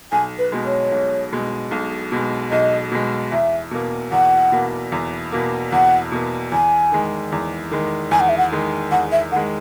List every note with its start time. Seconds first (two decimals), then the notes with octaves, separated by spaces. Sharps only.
0.12 B1 G#5
0.38 B4
0.52 B2 G#3
0.65 C#5
0.92 B1
1.32 B2 G#3
1.71 B1
2.12 B2 G#3
2.51 B1 D#5
2.91 B2 G#3
3.32 E2 E5
3.71 B2 A#3
4.12 E2 F#5
4.52 B2 A#3
4.92 E2
5.32 B2 A#3
5.72 E2 F#5
6.12 B2 A#3
6.51 E2 G#5
6.92 D#3 G#3
7.32 E2
7.71 D#3 G#3
8.11 E2 G#5
8.20 F#5
8.29 E5
8.38 F#5
8.52 D#3 G#3
8.91 E2 F#5
9.12 E5
9.32 D#3 G#3 F#5